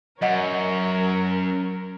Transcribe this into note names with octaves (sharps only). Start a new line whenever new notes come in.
F#2 F#3 A#4 C#5 D#5 F#5